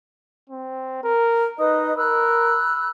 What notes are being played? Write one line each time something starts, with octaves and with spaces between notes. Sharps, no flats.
C4
A#4
D#4 B4 D#5 D#6
A#4 B5 E6 F#6